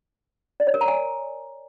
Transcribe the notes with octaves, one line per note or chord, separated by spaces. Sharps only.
D5
C#5
A#4
A#5
G#5